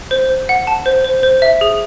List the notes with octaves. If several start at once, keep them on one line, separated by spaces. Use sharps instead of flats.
C5
C5
F#5
A5
C5
C5
C5
E5
G#4